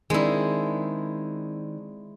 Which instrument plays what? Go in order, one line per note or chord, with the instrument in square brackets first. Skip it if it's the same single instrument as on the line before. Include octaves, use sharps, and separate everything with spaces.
[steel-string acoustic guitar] D#3 C4 D4 [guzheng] G#3 E4